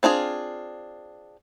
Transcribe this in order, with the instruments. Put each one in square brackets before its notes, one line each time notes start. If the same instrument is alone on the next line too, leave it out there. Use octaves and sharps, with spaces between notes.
[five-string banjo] C4 D4 F4 G#4